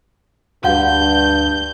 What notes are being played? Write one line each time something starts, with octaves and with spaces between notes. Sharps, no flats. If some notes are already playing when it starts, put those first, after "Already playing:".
D2 G2 F#4 F5 F#5 G6